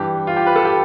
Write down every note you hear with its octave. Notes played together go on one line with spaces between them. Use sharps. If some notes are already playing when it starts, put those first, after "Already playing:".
Already playing: G2 E3 G4
F4
G4
B4
A4
G4